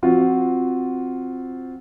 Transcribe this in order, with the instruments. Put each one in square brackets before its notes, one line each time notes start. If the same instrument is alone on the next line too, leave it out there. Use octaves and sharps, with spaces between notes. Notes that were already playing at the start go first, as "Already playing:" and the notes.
[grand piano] F3 C4 F4 F#4